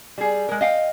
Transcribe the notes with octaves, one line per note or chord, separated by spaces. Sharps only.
G3 G#4
G#3 A#4
D#5 F5 G5